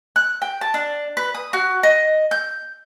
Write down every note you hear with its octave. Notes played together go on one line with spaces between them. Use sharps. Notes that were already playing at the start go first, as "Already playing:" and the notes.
F#6
G5
A5
D4
B4
D#6
F#4
D#5
G6